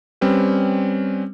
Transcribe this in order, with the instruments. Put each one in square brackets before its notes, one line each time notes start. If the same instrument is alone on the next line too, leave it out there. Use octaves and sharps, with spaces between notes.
[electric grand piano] G3 C4 C#4 B4